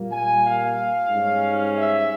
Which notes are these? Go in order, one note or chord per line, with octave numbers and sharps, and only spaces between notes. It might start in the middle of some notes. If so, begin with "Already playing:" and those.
Already playing: A#2 G3 A#3
G#5
F5
G#2 G3 C#4
E5